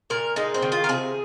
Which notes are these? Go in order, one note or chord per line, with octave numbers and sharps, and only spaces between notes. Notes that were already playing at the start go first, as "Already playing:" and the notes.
A#2 A#4
G#3 D#4
C4
D#3
F4
A#4
C3 G#4